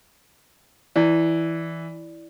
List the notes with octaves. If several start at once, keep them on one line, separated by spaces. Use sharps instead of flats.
E3 E4 D5